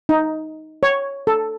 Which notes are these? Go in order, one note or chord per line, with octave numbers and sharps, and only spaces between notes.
D#4
C#5
A4